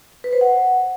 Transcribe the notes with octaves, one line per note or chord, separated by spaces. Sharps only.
B4
C5
F#5